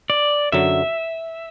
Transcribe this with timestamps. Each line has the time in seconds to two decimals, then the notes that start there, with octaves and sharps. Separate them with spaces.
0.10 D5
0.52 F#2 D3 F#3 E5